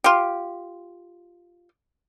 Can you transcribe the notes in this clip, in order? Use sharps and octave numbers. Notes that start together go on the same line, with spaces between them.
F4 G4